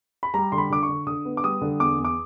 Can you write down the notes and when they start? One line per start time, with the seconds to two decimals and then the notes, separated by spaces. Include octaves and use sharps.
0.23 B5
0.34 G3 A#5
0.52 D3 C6
0.58 B5
0.70 D3 D6
0.83 C#6
0.89 D3
1.07 D3 D#6
1.25 B3
1.37 D6
1.43 G3 D#6
1.61 D3
1.80 E2 D6
1.98 E2
2.05 D6